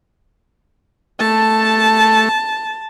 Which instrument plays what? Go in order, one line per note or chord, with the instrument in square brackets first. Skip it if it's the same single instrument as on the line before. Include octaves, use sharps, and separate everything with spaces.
[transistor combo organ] A3 [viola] A5